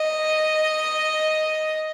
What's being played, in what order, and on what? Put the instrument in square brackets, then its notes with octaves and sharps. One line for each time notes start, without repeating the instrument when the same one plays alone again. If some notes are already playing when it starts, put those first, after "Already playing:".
Already playing: [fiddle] D#5